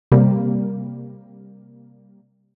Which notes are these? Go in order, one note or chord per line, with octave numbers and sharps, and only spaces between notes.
C3 G3 A#3